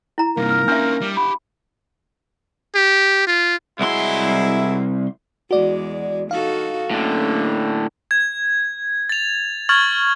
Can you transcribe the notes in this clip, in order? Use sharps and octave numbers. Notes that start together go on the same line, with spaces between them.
E4 A#5
G2 C3 A#3 D#4 A#4
F6
C#4 D4 E5 C6 F6
G3
G4 F#5 B5
G4
F4
C2 F#3 G#3 E4 C6
E2 G#3 F#4 D5
D#4 F#4 A4 F5
A2 D3 A#3 C#4
G#6
A6 F7
C#6 F6 G#6 A6 F#7